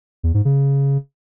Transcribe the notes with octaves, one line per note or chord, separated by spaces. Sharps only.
E2
G#2
C#3